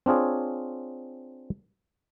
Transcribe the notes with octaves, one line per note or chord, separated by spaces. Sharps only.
C4 D4 F4 G#4 C#5